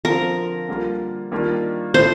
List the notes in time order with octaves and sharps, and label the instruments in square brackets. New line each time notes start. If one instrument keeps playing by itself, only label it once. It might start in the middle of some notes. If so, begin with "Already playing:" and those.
[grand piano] D3 F3 C4 [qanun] A#4
[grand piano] D3 G3 A#3 F4
D#3 G3 A#3 D4 F4
[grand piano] A2 A3 D4 F4 [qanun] C5